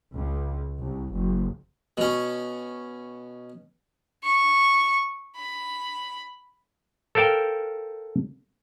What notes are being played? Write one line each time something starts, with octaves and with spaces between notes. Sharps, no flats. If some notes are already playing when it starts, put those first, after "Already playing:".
C#2
C2
F#1
B2 C#4
C#6
B5
A4 A#4 C5 F5 G5